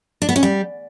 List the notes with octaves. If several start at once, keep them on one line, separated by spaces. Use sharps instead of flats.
D4
B3
C#4
G3